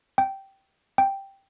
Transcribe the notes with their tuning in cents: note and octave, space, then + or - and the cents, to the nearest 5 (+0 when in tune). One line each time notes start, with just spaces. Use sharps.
G5 -10
G5 +0